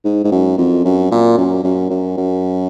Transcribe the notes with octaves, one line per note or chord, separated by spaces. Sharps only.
G#2
G#2
F#2
F2
F#2
A#2
F#2
F#2
F#2
F#2